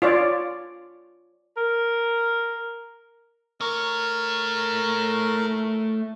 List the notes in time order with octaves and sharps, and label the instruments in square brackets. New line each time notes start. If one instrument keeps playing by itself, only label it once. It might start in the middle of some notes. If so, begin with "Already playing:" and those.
[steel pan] F4 C#5 D5
[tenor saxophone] A#4
[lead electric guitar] A3 C#5 [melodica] A#4